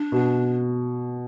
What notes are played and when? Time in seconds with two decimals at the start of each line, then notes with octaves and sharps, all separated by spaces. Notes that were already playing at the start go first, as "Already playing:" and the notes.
Already playing: D4
0.12 B2